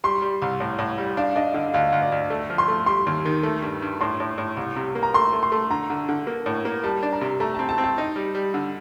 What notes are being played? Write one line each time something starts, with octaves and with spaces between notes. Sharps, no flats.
G3 C6
G3
C2
A2
A2
G3
D4 F5
D4 D#5
D3 F5
D2 F5
D2
D5
D2
A3
F3
C6
A3
G3 C6
D#2
D#3
A3
G2
G2
A2 C6
A2
A2
C2
C3
A#3
A#5
A3 C6
A3
C6
A3
D3 A#5
D3
D3
A#3
A2
A#3
G3 A5
D4
A#5
C3
A3 A#5
C4 A5
A5
C4
A5
D#4
G3
G3
D3